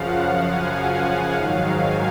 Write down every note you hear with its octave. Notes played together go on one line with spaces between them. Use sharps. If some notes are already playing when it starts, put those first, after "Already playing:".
Already playing: F#2 C#3 F3 F5 F#5
F5
G#5
F#5
G#2 D#3 F#3 F5
G#5